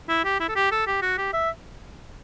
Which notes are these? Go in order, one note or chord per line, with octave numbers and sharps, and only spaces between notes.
E4
G4
E4
A4
G4
A4
G4
F#4
G4
E5